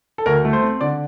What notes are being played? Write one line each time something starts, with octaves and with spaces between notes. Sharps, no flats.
A4
D2 A#4
A3
C5
C4
D3 D5